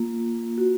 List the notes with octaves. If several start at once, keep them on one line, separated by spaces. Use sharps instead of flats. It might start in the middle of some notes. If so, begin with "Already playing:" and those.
Already playing: A#3 F4
F#4